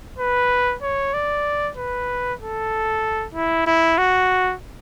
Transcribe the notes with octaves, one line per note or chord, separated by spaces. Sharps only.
B4
C#5
D5
B4
A4
E4
E4
F#4